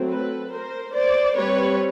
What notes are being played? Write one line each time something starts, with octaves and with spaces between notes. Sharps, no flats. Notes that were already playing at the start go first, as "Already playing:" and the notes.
Already playing: F#3 A3 C4
A4 B4
A#4 C5
C5 D5
G3 C4 B4 C#5